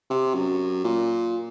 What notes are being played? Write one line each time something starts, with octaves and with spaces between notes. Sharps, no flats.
C3
F#2
A#2